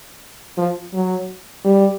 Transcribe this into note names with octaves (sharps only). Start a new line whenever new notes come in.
F3
F#3
G3